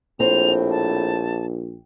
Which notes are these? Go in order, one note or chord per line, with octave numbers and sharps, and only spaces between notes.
A#1 A2 C4 F7
A5